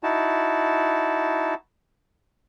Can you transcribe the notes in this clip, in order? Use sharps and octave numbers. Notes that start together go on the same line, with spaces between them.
D#4 E4 F#4 A5